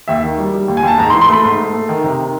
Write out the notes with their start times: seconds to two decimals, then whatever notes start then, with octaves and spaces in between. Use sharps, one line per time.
0.08 D#2 E5
0.23 D#3
0.38 G3
0.54 G3
0.68 D#2
0.77 G#5
0.83 D#2 A5
0.98 G#2 A#5
1.10 C6
1.13 E3
1.21 C6
1.29 A3 B5
1.44 G#2 C6
1.58 A3
1.73 A3
1.89 D#3
2.04 C3
2.19 D#3